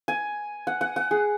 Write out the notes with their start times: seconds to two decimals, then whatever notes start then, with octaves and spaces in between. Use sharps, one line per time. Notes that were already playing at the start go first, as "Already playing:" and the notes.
0.08 G#5
0.67 F#5
0.81 F#5
0.96 F#5
1.11 G#4